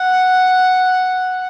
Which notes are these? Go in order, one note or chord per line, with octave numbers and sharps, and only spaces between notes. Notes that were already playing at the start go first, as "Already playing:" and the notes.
Already playing: F#5